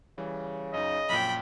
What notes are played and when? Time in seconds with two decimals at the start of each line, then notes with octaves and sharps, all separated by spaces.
0.18 C#3 E3 G3
0.74 F#2 D#4 D#5
1.09 A#1 F#2 A#2 G5 B5